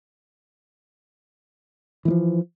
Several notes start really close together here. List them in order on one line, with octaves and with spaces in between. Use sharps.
E3 A3 F3